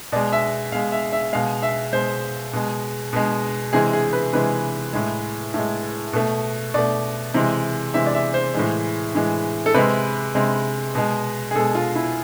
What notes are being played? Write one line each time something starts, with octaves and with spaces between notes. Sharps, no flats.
B2 G#3 D5
E5
B2 G#3 F5
E5
E5
B2 G#3 F5
E5
B2 G#3 C5
B2 G#3
B2 G#3
C3 E3 G#3 G#4
G#4
B4
C3 E3 G#3 B4
A2 G#3
A2 G#3
B2 A3
B2 A3 D5
C3 E3 G#3
C3 E3 G#3 E5
D5
E5
C5
A2 E3 G#3
A2 E3 G#3
A4
C3 G#3 B4
C3 G#3
B2 G#3
G#4
B2 G#3 A4
F4
E4